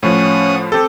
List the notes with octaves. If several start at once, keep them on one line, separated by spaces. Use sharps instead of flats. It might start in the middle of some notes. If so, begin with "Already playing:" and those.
A2 F3 C#4 F#5 D#6
C4 G4 A4